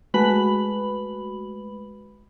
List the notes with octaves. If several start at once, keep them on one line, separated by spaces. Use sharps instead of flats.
G#3 A3 F#4 B4 B5 F#7